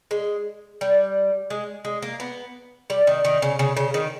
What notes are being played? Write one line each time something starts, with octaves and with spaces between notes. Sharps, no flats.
G#3
G3
G#3
G#3
A#3
B3
G3
D#3
D#3
C#3
C#3
C#3
D#3